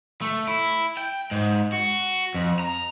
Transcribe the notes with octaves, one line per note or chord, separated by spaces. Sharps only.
A3
E4
G5
G#2
F#4
F2
A#5